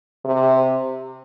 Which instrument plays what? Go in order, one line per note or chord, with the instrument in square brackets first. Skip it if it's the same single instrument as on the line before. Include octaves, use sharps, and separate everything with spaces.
[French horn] C3